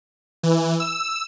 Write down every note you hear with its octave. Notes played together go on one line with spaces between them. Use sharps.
E3
E6